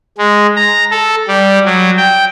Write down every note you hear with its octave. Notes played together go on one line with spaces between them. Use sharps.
G#3
A#5
A4
G3
F#3
G5